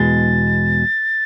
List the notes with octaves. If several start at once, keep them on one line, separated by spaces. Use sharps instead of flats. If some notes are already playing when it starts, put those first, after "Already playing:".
Already playing: E2 B2 G#3 A6